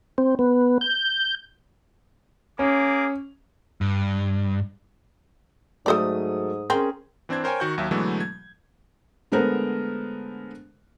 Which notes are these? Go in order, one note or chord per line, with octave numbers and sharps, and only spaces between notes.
C4
B3
G6
A#3 C#4 G#4 D6
G2
G#2 F#3 A3 A4 C5 D5 D#6
C4 C#4 G#4 A#4
E3 C4 D4 C5 G#6
A#4 C5 C#5 G5 G#5
D#3 F#4 F#5 G6
D#2 F#3 E5
B2 D3 E3 F#3 G#3 A3
G#6
D3 G#3 A3 B3 A#4 C5